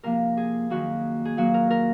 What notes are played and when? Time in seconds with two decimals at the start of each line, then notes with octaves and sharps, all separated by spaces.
0.03 C3 F3 A#3 A#4
0.37 G#4
0.70 F#2 D#3 A#3 F#4
1.25 G#4
1.37 A#2 F#3 A#3 F#4
1.54 A#4
1.70 A#4